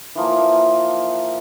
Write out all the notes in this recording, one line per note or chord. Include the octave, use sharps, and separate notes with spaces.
E3 F3 A#3